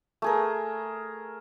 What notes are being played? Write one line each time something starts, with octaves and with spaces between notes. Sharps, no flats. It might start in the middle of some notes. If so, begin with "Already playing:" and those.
A3 G#4 A#4